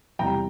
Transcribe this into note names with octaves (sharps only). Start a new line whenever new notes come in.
E2 C3 G3 G5 A#5